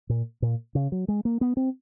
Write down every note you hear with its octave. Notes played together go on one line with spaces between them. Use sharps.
A#2
A#2
C#3
F#3
G#3
A#3
B3
C4